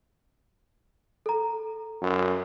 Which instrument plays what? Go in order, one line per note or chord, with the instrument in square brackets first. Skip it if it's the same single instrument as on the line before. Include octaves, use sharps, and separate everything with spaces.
[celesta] A4 A#5
[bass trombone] F#2